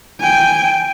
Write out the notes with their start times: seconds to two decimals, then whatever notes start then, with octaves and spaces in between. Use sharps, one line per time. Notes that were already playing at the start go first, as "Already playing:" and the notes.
0.20 G5 G#5